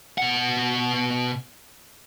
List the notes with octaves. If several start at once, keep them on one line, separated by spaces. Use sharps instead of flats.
B2 F#5